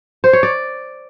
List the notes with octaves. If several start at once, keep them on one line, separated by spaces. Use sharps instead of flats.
C5
C#5
D5